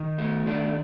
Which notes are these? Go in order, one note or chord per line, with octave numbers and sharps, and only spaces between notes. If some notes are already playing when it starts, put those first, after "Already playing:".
Already playing: D#3
A3
D#3 D4